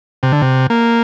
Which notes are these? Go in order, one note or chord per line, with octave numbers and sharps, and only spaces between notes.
C3
D3
C3
A#3